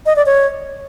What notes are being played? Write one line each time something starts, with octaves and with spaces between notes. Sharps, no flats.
D#5
D5
C#5